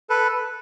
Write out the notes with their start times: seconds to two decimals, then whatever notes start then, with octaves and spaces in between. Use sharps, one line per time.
0.10 A4 B4